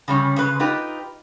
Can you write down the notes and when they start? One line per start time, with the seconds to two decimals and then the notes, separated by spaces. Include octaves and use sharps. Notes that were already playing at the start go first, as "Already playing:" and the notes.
0.08 C#3 G3 C#4
0.36 C#3 G#3 B4
0.60 D#4 F4 G4 B4